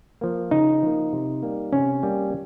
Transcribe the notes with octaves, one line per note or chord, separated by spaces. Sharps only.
F3 A#3
C#3 D#4
F3 A#3
C3
G3 A#3
C3 C#4
G3 A#3